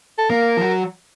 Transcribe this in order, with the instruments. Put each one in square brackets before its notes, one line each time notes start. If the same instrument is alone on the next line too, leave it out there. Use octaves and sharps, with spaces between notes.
[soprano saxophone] A4
[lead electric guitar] A#3 [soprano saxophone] A#4
[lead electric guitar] F3
F#3